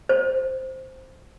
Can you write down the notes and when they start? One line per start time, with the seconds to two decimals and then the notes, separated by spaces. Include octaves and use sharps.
0.09 C5